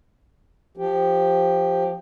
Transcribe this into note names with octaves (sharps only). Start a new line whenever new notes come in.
F3 G4